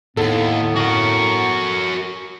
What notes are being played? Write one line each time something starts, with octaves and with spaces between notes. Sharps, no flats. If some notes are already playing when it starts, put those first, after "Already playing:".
D#2 A2 B3 A4
F#4 A#4 C#6